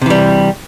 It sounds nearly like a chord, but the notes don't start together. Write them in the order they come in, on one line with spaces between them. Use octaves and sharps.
C3 E3 G3